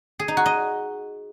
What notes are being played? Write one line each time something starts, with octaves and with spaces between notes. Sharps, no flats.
G#4
D#4
F#4
D#5